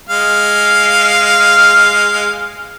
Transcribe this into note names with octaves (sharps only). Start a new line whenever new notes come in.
G#3 F5